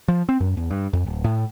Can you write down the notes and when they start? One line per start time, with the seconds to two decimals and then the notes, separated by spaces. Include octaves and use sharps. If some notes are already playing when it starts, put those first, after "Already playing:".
0.08 F3
0.29 C4
0.40 F#2
0.57 E2
0.71 G2
0.93 F2
1.06 D1
1.24 A2